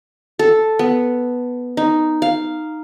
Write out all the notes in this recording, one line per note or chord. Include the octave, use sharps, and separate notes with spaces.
A4
B3
D#4
F5